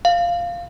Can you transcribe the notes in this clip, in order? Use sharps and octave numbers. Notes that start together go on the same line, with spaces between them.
F5